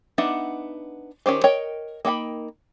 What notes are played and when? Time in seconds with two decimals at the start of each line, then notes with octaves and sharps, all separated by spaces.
0.18 B3 D4 D#4 E5 F#5
1.26 D#3 C#4 G4 C5
1.44 A#4 C#5 D#5 G5
2.05 A#3 D#4 G5 B5